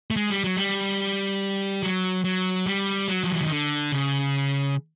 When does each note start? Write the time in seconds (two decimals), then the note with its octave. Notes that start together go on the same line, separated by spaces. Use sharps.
0.11 A3
0.16 G#3
0.30 G3
0.44 F#3
0.57 G3
1.82 F#3
2.24 F#3
2.66 G3
3.08 F#3
3.23 F3
3.32 E3
3.42 D#3
3.50 D3
3.92 C#3